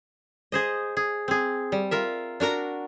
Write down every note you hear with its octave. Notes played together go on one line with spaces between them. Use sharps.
G#4 C5 D#5
G#4
C4 G#4
G3
F4 A#4 E5
D4 F#4 A#4 A#5